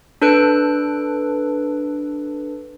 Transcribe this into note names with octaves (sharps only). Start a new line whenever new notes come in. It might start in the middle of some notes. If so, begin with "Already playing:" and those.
D4 A4 B4 F#6 D7